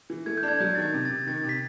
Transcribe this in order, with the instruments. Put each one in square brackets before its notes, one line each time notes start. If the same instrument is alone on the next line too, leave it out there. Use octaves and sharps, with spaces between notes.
[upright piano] E3
[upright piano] A3 [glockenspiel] G#6
[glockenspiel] G6
[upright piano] D4
[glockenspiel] G#6
[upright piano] F#3 [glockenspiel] G6
[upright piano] D#3 [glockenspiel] A6
[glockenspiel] G#6
[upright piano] C3
[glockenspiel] A6
[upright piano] C3
[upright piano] D#3 [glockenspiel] A6
[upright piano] C3
[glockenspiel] B6